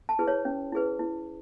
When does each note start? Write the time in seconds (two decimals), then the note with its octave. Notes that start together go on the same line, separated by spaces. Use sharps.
0.09 A5
0.19 E4 G#4 B4
0.28 C#5
0.45 C#4
0.72 E4 G#4 B4
0.99 E4